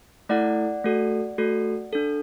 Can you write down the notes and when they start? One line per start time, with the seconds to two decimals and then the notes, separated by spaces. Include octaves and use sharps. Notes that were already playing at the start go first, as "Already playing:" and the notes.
0.29 A3 E4 A4 D5 F#5
0.85 A3 F#4 A4
1.38 A3 F#4 A4
1.93 D4 A4